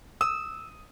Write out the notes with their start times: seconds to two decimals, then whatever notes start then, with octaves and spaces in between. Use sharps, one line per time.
0.21 D#6 E6